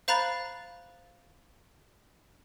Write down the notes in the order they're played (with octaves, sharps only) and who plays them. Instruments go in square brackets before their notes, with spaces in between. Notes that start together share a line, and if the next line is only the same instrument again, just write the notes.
[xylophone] C5 F5 A#5 B5 F#6 A6